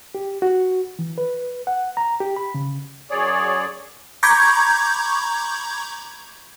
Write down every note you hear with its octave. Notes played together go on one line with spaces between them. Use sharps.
G4
F#4
E3
B4
F#5
A#5
G4
B5
C#3
F#2 G#4 C#5 D5
A#5 B5 C#6 D6 G6 G#6